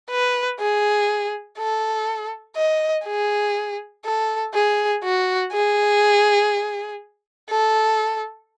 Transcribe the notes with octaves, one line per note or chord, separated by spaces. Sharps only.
B4
G#4
A4
D#5
G#4
A4
G#4
F#4
G#4
A4